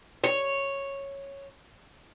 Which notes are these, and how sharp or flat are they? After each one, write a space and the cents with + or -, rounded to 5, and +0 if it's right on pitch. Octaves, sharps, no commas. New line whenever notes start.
C#5 -5